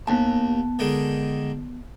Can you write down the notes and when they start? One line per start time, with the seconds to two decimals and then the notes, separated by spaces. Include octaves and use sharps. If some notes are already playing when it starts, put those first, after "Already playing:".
0.08 D#2 B3 G#5 A5
0.79 D3 D#3 G#3